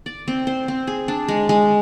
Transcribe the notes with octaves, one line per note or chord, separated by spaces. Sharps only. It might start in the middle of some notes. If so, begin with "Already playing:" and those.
D5
C4
C5
C4
G#4
D4
G#3
G#3